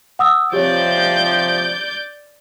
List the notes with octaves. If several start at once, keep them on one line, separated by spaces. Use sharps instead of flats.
F#5 D#6 E6
C3 F3 G4 C#5 D5 G6